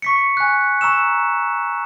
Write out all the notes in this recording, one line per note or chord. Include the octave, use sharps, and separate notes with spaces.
C#6 B6 C#7
G#5 F#6
A#5 C#6 E6 E7